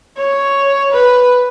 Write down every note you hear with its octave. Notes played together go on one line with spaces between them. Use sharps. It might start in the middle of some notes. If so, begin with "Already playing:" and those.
C#5
B4